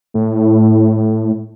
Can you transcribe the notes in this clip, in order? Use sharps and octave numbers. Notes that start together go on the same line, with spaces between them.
A2